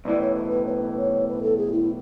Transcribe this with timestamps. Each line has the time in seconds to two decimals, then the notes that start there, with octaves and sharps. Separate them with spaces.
0.05 B1 A2 E3 D5
0.21 C#5
0.35 B4
0.51 B4
0.67 C#5
0.70 B4
0.97 C#5
1.28 B4
1.43 A4
1.57 G#4
1.72 E4